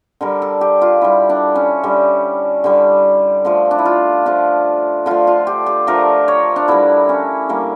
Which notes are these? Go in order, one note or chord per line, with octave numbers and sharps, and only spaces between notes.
D3 G3 A#4
A4
G4
F4
D3 G3 E4
D4
C#4
D3 G3
D3 G3
D3 F3 A3
D4
E4
F4
D3 F3 A3 D4
D3 F3 A3 F4
F4
G4
G4
D3 F3 A3 A#4
C#5
D4
D3 G3 E4
C#4
D3 G3 A#3